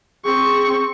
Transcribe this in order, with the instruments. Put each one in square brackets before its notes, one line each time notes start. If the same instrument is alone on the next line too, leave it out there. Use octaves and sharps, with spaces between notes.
[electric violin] C4 C#6 [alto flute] G#4